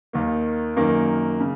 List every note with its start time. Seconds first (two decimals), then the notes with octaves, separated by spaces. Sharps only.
0.13 D#2 D#3 A#3
0.76 F#2 D#3 A#3
1.40 C#3